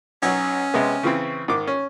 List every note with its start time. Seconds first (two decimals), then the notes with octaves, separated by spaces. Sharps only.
0.23 B1 F#3 C#4
0.74 C3 G#3 B3
1.03 C#3 E3 C4
1.48 G#2 D#3 D6
1.67 C#4